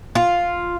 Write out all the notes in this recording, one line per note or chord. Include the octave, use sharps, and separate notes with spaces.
F4